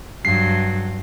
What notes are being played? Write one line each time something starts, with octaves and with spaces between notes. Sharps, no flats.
G2 F#3 C7